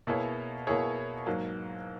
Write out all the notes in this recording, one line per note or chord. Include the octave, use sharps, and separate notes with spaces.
B2 A#3 E4 G#4 C#5
B2 A#3 E4 G#4 C#5
G#2 F#3 A#3